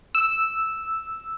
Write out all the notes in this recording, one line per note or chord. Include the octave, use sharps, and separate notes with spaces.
E6